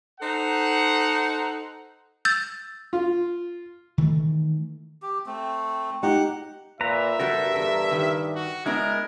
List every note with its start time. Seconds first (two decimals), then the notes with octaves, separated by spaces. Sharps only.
0.20 D#4 A4 C5 F#5
2.25 E6 G6 A6
2.93 F4
3.98 D#3 E3 A3
5.02 G4
5.26 A3 C4
6.03 D#4 G4 F#5
6.81 A#2 B4 E5 A#5
7.20 G2 G3 F#4 A4 A#4
7.54 E2 A#2 A4
7.91 D#3 G4
8.35 F#4
8.66 G#3 B3 D4 E4 A#4